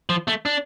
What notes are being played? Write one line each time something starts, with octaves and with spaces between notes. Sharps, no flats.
F3
A3
D4